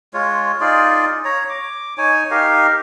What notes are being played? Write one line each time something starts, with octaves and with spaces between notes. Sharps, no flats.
G#3 F4 C#5
D#4 F4 G#4 D5
C#5 A#5
D6
D#4 C#5 G#5
D#4 G4 A#4 F5